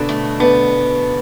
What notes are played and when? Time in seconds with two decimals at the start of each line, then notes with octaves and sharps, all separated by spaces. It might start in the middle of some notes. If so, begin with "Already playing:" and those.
Already playing: B2 D3 B3 D4 E4
0.09 A3
0.40 D3 B3 D4